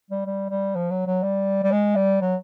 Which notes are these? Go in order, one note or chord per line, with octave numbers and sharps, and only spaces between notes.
G3
G3
G3
F3
F#3
F#3
G3
G3
G#3
G3
F#3